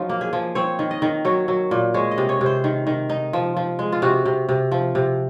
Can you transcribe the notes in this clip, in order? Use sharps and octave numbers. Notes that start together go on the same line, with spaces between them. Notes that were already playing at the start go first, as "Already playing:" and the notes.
Already playing: F3 F#3 D#4 F4
A#3
G#4
F3
C4 C#5
D#3
D#5
D#3
F#3 C#5
F#3
A#2
G#3 C#5
D#5
C3
C#5
C3
C5
D#3
D#3
D#4
F3
F3
G#3
F4
C3 F#4
C3
C3
F3
C3